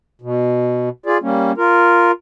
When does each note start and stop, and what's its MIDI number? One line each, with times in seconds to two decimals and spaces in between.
0.22 0.89 47
1.06 1.18 65
1.06 1.18 68
1.06 1.18 74
1.22 1.52 55
1.22 1.52 58
1.22 1.52 61
1.57 2.11 65
1.57 2.11 70